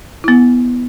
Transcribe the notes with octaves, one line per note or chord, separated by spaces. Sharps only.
B3 E4